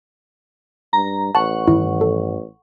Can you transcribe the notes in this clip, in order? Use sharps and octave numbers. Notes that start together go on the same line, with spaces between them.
G2 A#5
A1 F#5 A5 C#6
G2 D#3 E3 E4
A4